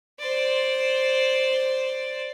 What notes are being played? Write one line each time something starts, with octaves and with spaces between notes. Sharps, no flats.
C5 D5